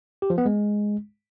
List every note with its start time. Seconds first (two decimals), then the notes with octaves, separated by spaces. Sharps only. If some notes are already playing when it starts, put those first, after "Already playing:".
0.22 G4
0.30 F3
0.38 B3
0.46 G#3